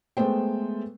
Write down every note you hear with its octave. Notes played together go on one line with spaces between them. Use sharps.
G#3 A3 B3 C5 G5